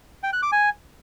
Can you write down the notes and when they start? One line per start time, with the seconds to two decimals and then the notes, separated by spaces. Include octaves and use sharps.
0.23 G5
0.33 F#6
0.42 D6
0.52 G#5